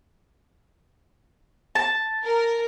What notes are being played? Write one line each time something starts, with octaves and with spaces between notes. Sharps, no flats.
A5
A#4